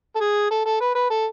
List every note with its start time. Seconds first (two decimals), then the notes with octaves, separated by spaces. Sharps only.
0.16 A4
0.20 G#4
0.51 A4
0.66 A4
0.81 B4
0.95 B4
1.10 A4